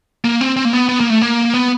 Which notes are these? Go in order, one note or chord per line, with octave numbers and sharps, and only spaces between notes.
A#3
C4
C4
A#3
B3
B3
A#3
A3
A#3
B3